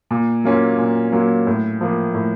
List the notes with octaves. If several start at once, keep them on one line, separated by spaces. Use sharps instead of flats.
A#2
F#3 A#3 C#4 F4
A#2
F#3 A#3 C#4 F4
A2
F3 A#3
A2